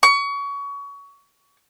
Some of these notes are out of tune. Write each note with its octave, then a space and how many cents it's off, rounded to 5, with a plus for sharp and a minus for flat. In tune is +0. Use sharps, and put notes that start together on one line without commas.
C#6 +25